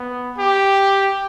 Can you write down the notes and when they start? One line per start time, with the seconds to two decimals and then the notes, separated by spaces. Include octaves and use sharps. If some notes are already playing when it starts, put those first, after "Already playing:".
Already playing: B3
0.38 G4